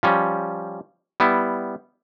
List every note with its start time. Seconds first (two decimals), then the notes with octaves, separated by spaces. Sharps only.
0.03 F3 G3 C#4
1.20 G3 B3 E4